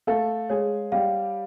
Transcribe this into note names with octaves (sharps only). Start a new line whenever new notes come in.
A3 A4 F5
G#3 G#4 C#5
G3 G4 F5